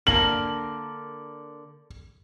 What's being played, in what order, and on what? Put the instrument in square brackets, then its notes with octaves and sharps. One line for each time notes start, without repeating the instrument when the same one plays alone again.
[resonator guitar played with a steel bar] D3 A#3 A#4 [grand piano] F#7